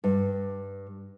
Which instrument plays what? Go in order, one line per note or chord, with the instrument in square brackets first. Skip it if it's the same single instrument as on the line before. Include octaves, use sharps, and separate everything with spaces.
[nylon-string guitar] G2